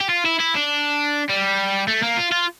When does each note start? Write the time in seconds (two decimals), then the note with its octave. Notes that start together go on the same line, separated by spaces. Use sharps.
0.01 G4
0.10 F4
0.25 E4
0.39 E4
0.55 D4
1.29 G3
1.88 A3
2.03 A#3
2.18 F4
2.32 F4